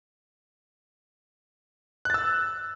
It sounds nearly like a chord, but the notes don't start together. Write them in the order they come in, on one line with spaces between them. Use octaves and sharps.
F#6 A6 E6